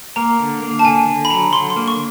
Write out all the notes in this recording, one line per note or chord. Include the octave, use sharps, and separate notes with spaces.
A#3 A#5
D3
A#3
A5
D3 G#5
D3
B5
F#3 A#5
D3 C6
C6
A#3
C#6